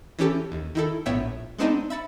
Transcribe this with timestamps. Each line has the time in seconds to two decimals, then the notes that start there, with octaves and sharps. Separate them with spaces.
0.19 E3 C#4 G4 A4
0.52 D#2
0.75 D#3 E4 A4
1.06 A#1 A2 B3 C#5 E5 G5
1.58 G#3 B3 C4 D4 D#4
1.90 E5 B5 A6 C#7